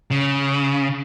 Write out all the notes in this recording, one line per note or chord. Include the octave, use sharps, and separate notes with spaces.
C#3